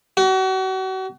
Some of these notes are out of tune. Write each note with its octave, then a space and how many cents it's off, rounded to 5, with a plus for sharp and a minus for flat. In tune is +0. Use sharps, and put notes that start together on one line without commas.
F#4 +35